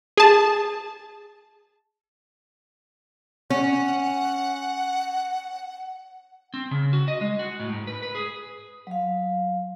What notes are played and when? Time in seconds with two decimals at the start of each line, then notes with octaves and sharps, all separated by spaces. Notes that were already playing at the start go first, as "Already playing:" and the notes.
0.17 G#4 A5
3.50 C#4 F#5
6.54 C4
6.71 C#3
6.93 F#4
7.08 D#5
7.21 G#3
7.39 F#4
7.60 A2
7.73 G#2
7.87 B4
8.03 B4
8.15 G#4
8.87 F#3 F5